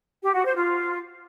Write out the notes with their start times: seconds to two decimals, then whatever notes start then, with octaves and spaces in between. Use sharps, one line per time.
0.23 G4
0.34 F#4
0.44 C5
0.55 F4